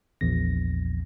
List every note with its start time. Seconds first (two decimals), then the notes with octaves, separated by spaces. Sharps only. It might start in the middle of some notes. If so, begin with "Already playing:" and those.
0.21 A#1 E2 A#6